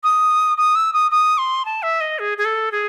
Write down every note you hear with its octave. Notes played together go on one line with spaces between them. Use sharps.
D#6
D#6
E6
D#6
D#6
C6
A5
E5
D#5
G#4
G#4
A4
G#4